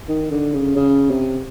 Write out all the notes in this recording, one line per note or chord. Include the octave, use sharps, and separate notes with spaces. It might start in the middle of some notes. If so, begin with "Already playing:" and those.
D#3
D3
C#3
C#3
C3